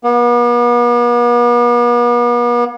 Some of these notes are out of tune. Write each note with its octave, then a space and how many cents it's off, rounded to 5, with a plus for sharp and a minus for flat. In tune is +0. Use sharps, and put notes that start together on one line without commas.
B3 -45